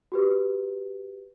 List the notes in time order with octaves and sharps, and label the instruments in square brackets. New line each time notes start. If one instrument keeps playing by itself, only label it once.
[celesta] F#4 G4 B4